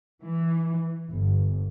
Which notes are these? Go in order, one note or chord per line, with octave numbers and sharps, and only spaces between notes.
E3
G1